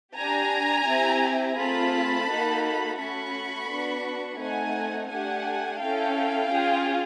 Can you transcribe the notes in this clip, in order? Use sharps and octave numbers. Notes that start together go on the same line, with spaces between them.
D4 G4 G#5 A#5
C4 E4 G4
A3 C4 F4 G#4 A5 B5
A#3 D#4 F#4 A4
A3 C#4 F#4 A4 B5 C#6
B3 D4 F#4
A3 C4 D#4 F#5 G#5
A3 D4 G4 F#5 G#5
C#4 E4 A4 F5 G5
C#4 F4 G#4